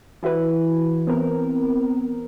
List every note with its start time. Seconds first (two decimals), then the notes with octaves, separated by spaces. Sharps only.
0.23 E3 E4 F#4 B4
1.07 B3 C4 A#4